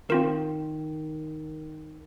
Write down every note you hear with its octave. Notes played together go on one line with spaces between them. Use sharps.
D#3 C4 F4 A#4